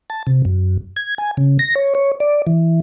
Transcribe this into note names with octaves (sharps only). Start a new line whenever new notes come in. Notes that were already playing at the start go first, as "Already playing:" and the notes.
A5
C3
F#2
G#6
G#5
C#3
A#6
C#5
C#5
D5
E3